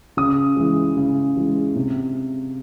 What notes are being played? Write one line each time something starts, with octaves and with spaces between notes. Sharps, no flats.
C#3 D#6
E3 G#3
C#3
E3 G#3
C3